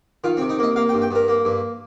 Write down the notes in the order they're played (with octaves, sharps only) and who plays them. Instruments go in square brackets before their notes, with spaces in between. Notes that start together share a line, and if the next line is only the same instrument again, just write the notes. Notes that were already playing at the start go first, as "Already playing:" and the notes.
[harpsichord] D#3 F4
C4
C3
D#4
A#3 D#5
A#3 F5
G5
G2
G5
G2 A#4
A#3
G2